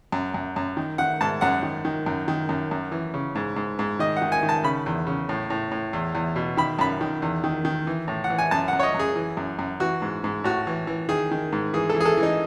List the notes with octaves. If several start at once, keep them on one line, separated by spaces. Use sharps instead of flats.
F#2
F#2
F#2
D#3
D#3 F#5
G#2 A5
F#2 F#5
D#3
D#3
F#2
D#3
F#2
F#2
E3
C#3
G#2
G#2
G#2
D#3 D#5
F#5
D#3
G#5
D#3
A5
C#3 B5
E2
C#3
A2
A2
A2
E2
E2
B2
D#3 B5
F#2 B5
D#3
E2
D#3
D#3
E3
A2
F#5
E3
G#5
F#2 A5
F#2 F#5
C#5
D#5
F#2
G#4
E3
F#2
F#2
E3 F#4
G#2
G#2
A2 F#4
E3
E3
D#3 G#4
D#3
G#2
E3 G#4
A4
E3
G#4
A4
E3
D#4